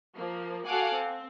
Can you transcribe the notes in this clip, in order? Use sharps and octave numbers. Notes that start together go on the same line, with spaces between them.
F3 A#3
F#4 A4 F5 F#5 G#5 D6
C4